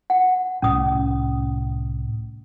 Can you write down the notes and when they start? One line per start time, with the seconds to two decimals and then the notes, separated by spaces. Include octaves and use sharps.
0.10 F#5
0.62 C2 A2 G3 C#4 D#6